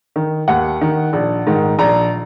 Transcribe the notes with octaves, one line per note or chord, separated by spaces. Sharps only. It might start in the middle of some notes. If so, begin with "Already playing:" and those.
D#3
D#2 F#5
D#3
A#1
G#2 D#3
A#1 A#5